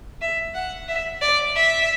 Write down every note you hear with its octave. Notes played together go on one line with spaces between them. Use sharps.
E5
F#5
E5
D5
E5